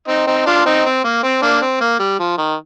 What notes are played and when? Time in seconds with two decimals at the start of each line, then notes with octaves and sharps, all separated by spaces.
0.08 C4 D#4
0.27 C4 D#4
0.46 D4 F4
0.66 C4 D#4
0.85 C4
1.05 A#3
1.24 C4
1.42 A#3 D4
1.61 C4
1.81 A#3
2.00 G3
2.20 F3
2.38 D#3